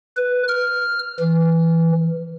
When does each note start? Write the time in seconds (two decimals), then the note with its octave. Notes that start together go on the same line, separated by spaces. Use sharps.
0.17 B4
0.48 F6
1.20 E3